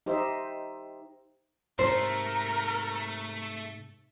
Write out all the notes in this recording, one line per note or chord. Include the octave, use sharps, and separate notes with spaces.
D#4 G4 C5 D#5 E5
G#2 C3 A3 A4 A#4 C5